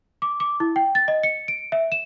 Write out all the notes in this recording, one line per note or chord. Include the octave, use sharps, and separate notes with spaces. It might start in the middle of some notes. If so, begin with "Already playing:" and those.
D6
D6
E4
G5
A6
D#5
C#7
D7
E5
E7